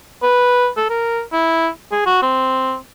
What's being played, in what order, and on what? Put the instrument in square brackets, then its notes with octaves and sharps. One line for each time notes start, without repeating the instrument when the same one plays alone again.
[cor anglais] B4
A4
A#4
E4
G#4
F#4
C4